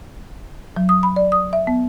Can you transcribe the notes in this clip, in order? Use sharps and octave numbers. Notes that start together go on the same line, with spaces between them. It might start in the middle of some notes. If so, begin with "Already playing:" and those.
F#3
D#6
B5
D5
D#6
E5
B3